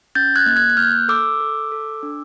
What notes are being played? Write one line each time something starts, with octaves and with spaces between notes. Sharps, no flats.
C#4 G6 A6
F#6 G#6
A#3
F#6 G#6
F#6
A#3 F6 G6
A4 D6 E6
A4
A4
D4